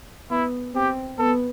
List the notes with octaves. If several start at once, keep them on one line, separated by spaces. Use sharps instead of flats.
B3 E4
C4 G4
B3 A4